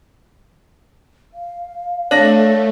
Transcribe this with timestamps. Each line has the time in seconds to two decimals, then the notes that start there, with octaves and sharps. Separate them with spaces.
1.34 F5
2.11 A3 D4 C#5 A#6